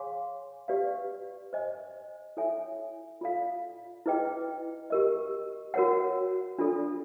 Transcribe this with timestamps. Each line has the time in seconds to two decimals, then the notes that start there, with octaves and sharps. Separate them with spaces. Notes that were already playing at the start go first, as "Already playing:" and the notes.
Already playing: G#4 C#5 F5 G#5 C6
0.68 G4 B4 D5 F5
1.53 C5 D#5 G#5
2.37 E4 A4 C#5 E5 G#5
3.21 F4 A4 D5 F5
4.06 E4 G#4 B4 D#5 G5
4.90 G4 A#4 D#5
5.74 F#4 A#4 C#5 F#5
6.59 D4 F4 A4 D5